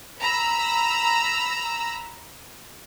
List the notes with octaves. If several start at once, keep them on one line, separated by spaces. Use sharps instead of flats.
A#5 B5 E6